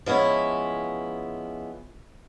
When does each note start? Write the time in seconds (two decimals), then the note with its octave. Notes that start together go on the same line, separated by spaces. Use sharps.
0.06 F3 G#3 B3 C#4 E4